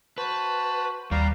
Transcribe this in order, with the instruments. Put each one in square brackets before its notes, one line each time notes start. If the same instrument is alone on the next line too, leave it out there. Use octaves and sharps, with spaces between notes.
[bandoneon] F#4 C5 [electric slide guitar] B4 [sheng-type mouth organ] A5
[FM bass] D#2 [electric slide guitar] G3 [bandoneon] B4 D5 [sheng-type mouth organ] F5 A#5